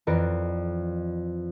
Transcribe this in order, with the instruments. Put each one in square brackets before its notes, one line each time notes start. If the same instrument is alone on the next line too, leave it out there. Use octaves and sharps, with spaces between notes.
[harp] F2 E3 B4 D5 A#5 C#7